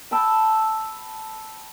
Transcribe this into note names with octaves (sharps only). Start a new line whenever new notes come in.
G5 A5 B5 E6